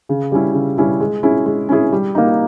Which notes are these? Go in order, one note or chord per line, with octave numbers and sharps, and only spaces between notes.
C#3
G3 C#4 E4
C#3
G3 C#4 E4
G#3
C#4 E4 G#4
G#3
C#4 E4 G#4
G3
A#3 D#4